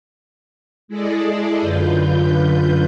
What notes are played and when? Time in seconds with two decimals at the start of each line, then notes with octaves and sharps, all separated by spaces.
0.88 G#3 E4 G#4 A4 D5 D#5
1.61 F#2 D3 F4 B4 G6